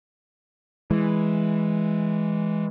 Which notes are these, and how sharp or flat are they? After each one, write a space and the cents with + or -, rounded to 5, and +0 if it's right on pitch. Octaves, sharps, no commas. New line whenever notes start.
E3 +0 G#3 +0